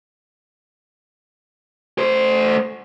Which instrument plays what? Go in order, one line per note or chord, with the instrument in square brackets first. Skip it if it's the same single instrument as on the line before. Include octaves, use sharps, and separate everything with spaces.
[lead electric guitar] A3 C5